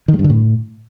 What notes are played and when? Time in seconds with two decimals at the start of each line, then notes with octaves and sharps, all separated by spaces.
0.08 D#3
0.14 G#3
0.19 G2
0.24 D3
0.30 A2